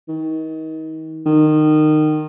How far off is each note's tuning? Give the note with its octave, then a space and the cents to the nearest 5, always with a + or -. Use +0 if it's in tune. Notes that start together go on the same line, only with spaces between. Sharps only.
D#3 +30
D#3 -20